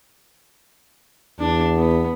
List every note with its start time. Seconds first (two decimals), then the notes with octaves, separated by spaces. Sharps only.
1.39 E2 D4
1.76 B3